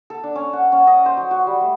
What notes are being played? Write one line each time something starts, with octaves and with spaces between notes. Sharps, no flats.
A4
D4
C#4
F#5
C#4
D#5
C5
F#3
F#4
G3
A3